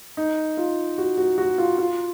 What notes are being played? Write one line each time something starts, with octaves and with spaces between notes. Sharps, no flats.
D#4
F4
F#4
F#4
F#4
F4
F4